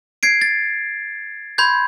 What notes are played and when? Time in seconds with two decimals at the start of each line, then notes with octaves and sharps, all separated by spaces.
0.23 G#6 C7 D7
0.41 A6
1.58 B5 C6 G6 G#6